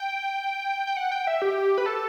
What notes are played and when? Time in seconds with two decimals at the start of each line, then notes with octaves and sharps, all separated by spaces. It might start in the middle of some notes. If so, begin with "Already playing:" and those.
Already playing: G5
0.87 G5
0.97 F#5
1.12 G5
1.27 E5
1.42 G4
1.78 B4
1.86 A4